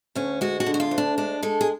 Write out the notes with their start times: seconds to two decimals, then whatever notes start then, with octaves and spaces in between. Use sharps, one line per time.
0.15 D2 C#4
0.41 G#3 F#4
0.60 F#4
0.66 D3
0.74 F#4
0.80 F4
0.91 D2
0.98 D4
1.18 G#3 D4
1.43 G#3 A4
1.61 G#4